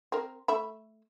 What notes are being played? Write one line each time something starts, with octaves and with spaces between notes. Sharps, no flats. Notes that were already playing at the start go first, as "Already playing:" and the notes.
C4 A#4
A3 E5 B5